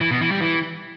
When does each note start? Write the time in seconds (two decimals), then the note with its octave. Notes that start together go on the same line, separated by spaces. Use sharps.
0.01 E3
0.11 B2
0.21 E3
0.31 G3
0.41 E3